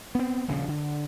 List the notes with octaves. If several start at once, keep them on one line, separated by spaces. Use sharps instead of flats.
B3 C4
D#1 A#1 A2 C#3
D3